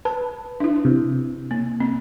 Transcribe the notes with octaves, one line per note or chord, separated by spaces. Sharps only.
B4 A5
D4 E4
C3
A#3
C4